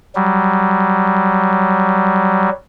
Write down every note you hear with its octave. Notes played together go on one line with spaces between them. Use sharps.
F#3 G3